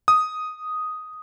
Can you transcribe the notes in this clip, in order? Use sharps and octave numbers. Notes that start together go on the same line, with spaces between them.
D#6